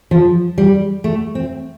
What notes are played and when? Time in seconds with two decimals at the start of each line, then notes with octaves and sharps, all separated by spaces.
0.11 F3
0.58 G3
1.04 A3
1.35 C4